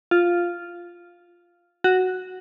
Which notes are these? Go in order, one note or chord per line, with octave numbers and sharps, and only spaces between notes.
F4
F#4